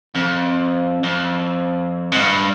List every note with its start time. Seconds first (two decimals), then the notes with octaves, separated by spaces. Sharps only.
0.15 F2
1.03 F2
2.12 G#2
2.19 G2